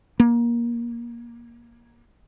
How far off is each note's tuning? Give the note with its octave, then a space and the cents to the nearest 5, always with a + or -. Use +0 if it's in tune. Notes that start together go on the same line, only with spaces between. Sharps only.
A#3 +20